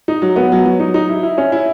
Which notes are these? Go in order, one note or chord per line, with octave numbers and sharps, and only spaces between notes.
D#4
F#3
B3
F#3
F#3
D#4
D#4
E4
E4
C#4
E4